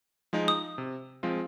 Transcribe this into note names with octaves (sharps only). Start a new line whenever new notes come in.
F3 G#3 D#4
D#6
C3
F3 G#3 C4 F4